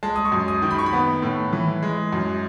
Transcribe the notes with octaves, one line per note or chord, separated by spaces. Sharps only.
G#3 A5
D#6
C#6
F#2
D#6
D#3
B5
C#6
B5
B3
A2
E3
G#3
F#2